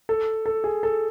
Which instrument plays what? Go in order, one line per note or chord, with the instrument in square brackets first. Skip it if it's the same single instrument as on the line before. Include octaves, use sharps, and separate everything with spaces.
[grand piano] A4
A4
G#4
A4